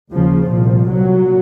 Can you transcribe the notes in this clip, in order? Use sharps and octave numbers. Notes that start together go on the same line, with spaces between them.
D#2 C#3 F3
C2 A#2 F3
C2 A#2 F#3